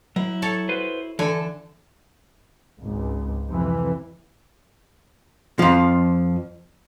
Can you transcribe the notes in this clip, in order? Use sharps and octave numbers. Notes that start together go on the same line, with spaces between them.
F#3 E4
A4 C#5 A5
F#4 B4 C5
D3 E3 D4 A4 G#5
G#1 C#2
F2 C3 E3
F2 F3